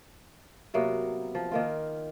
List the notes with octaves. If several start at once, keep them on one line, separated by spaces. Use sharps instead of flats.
C3 F#3 A#3 B3
F3
D#3 A#3 F4